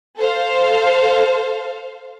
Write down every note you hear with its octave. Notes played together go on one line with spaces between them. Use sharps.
A4 C5 F5